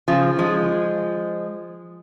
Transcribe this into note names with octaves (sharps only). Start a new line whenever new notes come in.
C#3 F3
F3 G#3